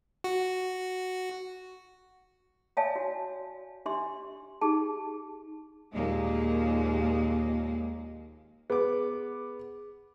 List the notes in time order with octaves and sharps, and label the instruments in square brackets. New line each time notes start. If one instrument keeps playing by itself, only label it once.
[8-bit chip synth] F#4
[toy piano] C#5 D5 E5 F5 G#5 A5
F#4
D4 G4 E5 C6
D#4 G4 G#4 A5
[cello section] D#2 A#2 G#3 A#3
[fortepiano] B3 D6 [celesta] G#4